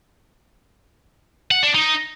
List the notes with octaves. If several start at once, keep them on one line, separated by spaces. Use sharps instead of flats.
F#5
D4
D#4